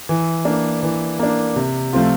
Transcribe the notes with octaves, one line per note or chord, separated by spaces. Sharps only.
E3
A#3 D4
E3
A#3 D4
C3
F3 A3 C4 F4